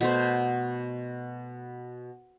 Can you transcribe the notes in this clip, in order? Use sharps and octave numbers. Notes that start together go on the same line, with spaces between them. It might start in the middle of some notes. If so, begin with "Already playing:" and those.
B2 A3 C5